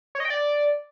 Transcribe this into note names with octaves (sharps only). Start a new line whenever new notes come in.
C#5
D#5
G5
D5